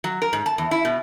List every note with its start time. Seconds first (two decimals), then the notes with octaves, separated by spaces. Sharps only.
0.04 F#3
0.22 A#4
0.33 G#2
0.46 A5
0.58 E2
0.71 E4
0.85 B2